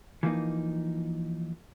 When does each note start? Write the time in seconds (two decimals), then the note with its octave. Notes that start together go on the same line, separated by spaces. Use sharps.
0.23 E3 F3 A#3 D#4